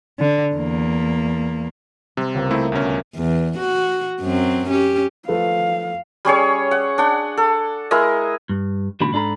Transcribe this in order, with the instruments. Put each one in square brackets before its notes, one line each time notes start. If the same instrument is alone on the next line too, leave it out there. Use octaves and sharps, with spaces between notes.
[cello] D3
E2 A#3
[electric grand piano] C3 [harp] G3 C4
[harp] C#2 A#3
[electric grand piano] A3 C4 E4 [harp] E5 D#6
[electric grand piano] D2 B2 C#4
[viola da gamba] E2
F#4
F#2 F#3 C4
C#4 G4
[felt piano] F3 A3 B4 [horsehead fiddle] F5
[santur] G3 C#4 G#4 C#5
F#5
D4 F#5
A4
G#3 E4 A#4 D#5
[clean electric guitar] G2
C#2 A#2 D#3 D4 F#4 B5
G#2 D4 A4 A#5 B5